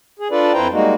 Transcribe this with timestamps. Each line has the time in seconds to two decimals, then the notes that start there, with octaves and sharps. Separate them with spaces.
0.19 G#4
0.31 D4 F4 A4 B4 D5
0.54 F2 E4 B4 C5 G5 A#5
0.72 G3 G#3 A#3 D#4 F#4